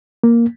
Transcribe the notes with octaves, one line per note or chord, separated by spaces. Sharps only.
A#3